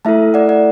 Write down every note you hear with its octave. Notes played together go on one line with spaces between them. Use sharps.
A3 E4 A4 E5 A5
D5 F#5
D5 F#5